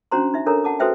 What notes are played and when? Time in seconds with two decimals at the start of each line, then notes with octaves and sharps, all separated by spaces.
0.12 C#4 D4 F#4 C5 A#5 C6
0.34 D#4 E5
0.46 D4 A4 A#4 C#5 A#5
0.64 F#5 A5 D6
0.79 F#4 A4 B4 C5 E5 G5